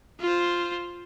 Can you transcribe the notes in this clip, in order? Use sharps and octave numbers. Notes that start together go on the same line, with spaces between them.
F4 C5